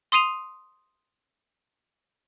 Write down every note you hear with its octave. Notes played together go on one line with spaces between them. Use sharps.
C6 D#6 C7 D#7 F7